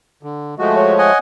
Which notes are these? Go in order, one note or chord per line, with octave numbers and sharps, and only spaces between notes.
D3
F3 G#3 A3 F#4
C#5
D#5 F#5 G#5